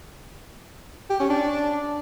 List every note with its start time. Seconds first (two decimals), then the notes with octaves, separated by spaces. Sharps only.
1.10 G4
1.20 C#4
1.30 D4